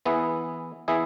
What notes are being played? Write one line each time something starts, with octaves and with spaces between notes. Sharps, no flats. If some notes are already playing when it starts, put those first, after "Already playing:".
E3 B3 E4 G#4
E3 B3 E4 G#4